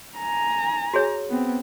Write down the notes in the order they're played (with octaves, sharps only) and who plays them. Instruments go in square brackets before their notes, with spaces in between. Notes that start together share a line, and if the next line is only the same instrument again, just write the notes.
[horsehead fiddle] G#5 A#5
[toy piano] F#4 G#4 C#5
[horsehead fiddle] B3 C4